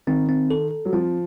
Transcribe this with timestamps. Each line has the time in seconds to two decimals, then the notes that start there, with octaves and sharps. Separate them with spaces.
0.07 D#3 C4
0.29 C4
0.51 A4
0.71 A4
0.85 F#3
0.93 F3 C4